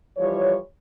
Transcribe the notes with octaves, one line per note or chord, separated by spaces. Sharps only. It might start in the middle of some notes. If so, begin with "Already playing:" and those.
E3 F3 G3 C#5